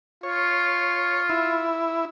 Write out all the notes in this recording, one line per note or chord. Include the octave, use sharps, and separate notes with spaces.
F4 C#5
E4